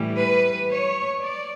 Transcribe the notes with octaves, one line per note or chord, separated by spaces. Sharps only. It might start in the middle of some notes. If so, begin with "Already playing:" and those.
Already playing: A2 E3 G3
B4
C#5
D5